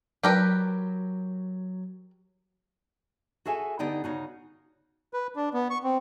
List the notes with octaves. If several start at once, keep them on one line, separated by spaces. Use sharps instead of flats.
F#3 G4 A#4 B4
F#4 G#4 A4 E5 G#5
D3 B3 D#4 G4 D5 G5
C#3 D#4 F#4
B4
D4
B3
C#6
C4